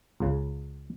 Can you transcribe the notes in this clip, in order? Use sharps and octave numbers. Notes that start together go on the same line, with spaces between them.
C#2 C#3